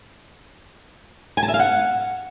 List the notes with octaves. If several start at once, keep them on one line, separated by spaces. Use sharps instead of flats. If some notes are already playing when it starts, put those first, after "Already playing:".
G#5
A5
E5
F5
F#5